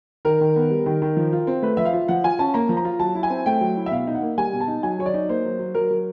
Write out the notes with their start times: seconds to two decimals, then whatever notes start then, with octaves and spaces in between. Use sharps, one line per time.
0.25 D#3 A#4
0.41 D#3
0.56 B3
0.70 G3
0.86 D#3
1.02 D#3
1.17 F3
1.33 F4
1.47 C4
1.63 A3 B4
1.77 F3 E5
1.85 F5
1.93 F4
2.08 F3 F#5
2.24 F4 G#5
2.39 C#4 A5
2.54 A#3 A#5
2.69 F3
2.77 A#5
2.85 F4
2.99 F#3 A5
3.15 E4
3.23 G#5
3.30 C4
3.46 A3 G5
3.61 F#3
3.77 E4
3.86 E5
3.91 B2 F5
4.07 D#4
4.15 F#5
4.22 A#3
4.38 G3 G#5
4.53 B2
4.61 A5
4.68 D#4
4.83 F#3 G#5
4.99 F#3 C#5
5.06 D5
5.14 D#4
5.29 A#3 C5
5.45 F#3
5.59 F#3
5.75 F#3 A#4
5.91 F#3